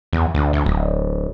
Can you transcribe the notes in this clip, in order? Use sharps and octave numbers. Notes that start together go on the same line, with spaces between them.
E2
D2
D2
D1